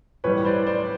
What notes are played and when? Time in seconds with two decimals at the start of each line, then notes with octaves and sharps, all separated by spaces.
0.24 A2 E3 G3 B4 C#5
0.45 C5 D5
0.66 C5 D5